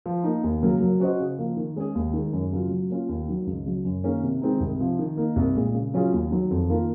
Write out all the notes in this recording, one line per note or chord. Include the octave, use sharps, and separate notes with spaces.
F3
A#3 D#4
D#2
C#3 F#3 A#3
F#3
C#4 F#4 C5 D#5
C#3
F3 A#3
D#3
G#3 C#4 G#4
D#2
D#3 G#3
F#2
C#3 F#3 C#4 F4
F#3
A#3 C#4 F4
D#2
D#3 F#3
C#2
C#3 F#3
F#2
D#3 A#3 C#4 G#4
C3
D#3 G#3 C4 D#4
C2
C3 F3
D#3
A#3 D#4
C2
A#2 G#3
C#3
F#3 C#4 F4 G#4
D#2
D#3 F#3
F2
D#3 A#3 F4 A#4